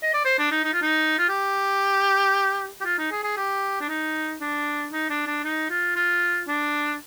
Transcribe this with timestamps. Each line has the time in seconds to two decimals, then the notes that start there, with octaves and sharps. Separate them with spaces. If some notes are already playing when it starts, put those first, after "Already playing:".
0.02 D#5
0.14 D5
0.25 C5
0.39 D4
0.52 D#4
0.64 D#4
0.73 F4
0.82 D#4
1.19 F4
1.29 G4
2.81 G4
2.85 F4
2.98 D#4
3.11 G#4
3.24 G#4
3.37 G4
3.81 D4
3.89 D#4
4.41 D4
4.92 D#4
5.10 D4
5.27 D4
5.44 D#4
5.70 F4
5.96 F4
6.48 D4